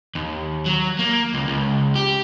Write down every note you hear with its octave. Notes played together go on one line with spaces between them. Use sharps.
D#2
F#3
A#3
C#2
C#2
G4